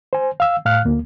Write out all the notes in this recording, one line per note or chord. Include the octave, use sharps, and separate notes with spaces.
C5 G#5
F5 E6
A2 F5 F6 F#6
D2 A#3